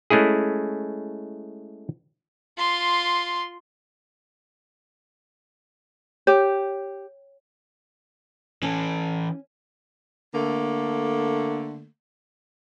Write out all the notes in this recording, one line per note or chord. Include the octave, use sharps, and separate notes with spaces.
G#3 A3 C#4 E4 G#4
F4 C6
G4 C#5
E3 C#4 A4
D3 A3 A#3